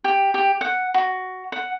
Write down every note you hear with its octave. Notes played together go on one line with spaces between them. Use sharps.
G4
G4
F#5
F#4
F#5